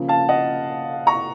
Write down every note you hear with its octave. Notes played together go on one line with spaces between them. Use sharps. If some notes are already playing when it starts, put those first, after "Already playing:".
Already playing: C#3 F3 A#3
F5 A5
D#5 F#5
A#5 C#6